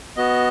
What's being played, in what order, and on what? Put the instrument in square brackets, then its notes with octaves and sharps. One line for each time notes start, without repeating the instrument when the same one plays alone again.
[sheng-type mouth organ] B3 F#4 D#5